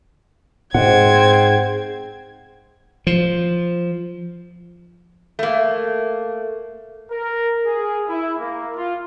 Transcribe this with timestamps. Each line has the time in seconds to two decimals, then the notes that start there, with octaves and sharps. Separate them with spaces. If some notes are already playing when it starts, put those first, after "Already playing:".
0.74 G#2 C4 F#5 G#6
3.07 F3
5.39 A3 A#3
7.11 A#4
7.66 G#4
8.07 E4
8.38 A#3
8.76 F4